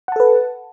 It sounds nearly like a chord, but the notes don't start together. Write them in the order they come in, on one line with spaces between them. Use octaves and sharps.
F#5 A5 A4 B4